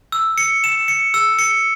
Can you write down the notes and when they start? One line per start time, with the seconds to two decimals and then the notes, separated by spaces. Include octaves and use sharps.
0.12 E6
0.38 C#7
0.64 E7
0.88 C#7
1.14 E6
1.39 C#7